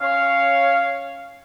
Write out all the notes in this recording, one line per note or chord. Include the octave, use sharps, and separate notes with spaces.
C#4 C#5 F5